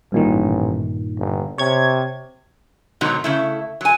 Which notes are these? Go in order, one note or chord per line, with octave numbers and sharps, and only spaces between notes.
A1 G2 A#2 D#3
G1
C3 C#5 G#6
G#2 B2 D#3 F#3
C#3 A3 E4
F#3 G#5